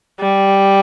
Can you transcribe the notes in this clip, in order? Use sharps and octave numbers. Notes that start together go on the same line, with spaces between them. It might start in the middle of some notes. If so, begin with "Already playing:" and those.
G3